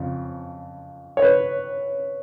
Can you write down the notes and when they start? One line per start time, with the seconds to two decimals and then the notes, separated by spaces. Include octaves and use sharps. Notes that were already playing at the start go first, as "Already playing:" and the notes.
Already playing: F2 C#3
1.17 C#5
1.22 B4